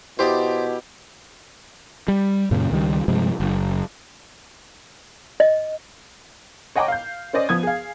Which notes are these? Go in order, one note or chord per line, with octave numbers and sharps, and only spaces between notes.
B2 E4 G4 C5 D5 D#6
G3
F#2 A#2 C#3
C#2 D#3 G3
G2 C3 F3 G#3
F#1
D#5
C#5 D#5 F#5 G5 A#5 D6
F5 G6
C#4 C5 D5 D#5
F3 B3 D#6 G#6
G#4 F5